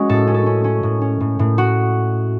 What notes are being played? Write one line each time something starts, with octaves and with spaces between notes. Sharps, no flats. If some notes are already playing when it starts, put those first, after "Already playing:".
Already playing: G#3 C#4 F#4
A2 A4
C#4
A4
C#4
C#4
A2
C#4
A2
A2
F#4